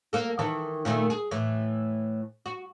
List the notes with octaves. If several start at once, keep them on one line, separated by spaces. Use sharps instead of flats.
A#3 A4
D#3 E3 A4
A#2 D#3 A3
G#4
A2 E3
F#4